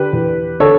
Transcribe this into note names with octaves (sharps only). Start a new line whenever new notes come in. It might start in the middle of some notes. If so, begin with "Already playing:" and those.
Already playing: D3 G4 B4
E2
D3 A4 C#5